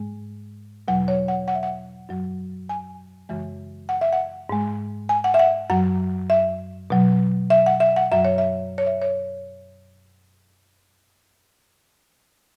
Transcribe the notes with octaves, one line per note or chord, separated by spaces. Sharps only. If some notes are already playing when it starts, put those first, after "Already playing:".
Already playing: G#2 G#3
E2 B2 F#3 F#5
C#5
F#5
F#5
E5
F#5
F#2 F#3
G#5
F#2 C#3 E3 G#3
F#5
E5
F#5
G#2 G#3
G#5
F#5
E5
F#5
F#2 F#3 F#5
E5
B2 F#3
E5
F#5
E5
F#5
F#2 F#3 E5
C#5
E5
C#5
E5
C#5